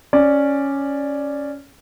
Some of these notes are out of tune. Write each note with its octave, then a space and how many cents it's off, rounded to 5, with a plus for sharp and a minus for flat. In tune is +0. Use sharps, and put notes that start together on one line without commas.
C#4 +0 D5 +0